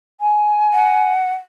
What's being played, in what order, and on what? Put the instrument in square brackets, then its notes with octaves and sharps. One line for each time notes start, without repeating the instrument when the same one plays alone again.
[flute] G#5
[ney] F#5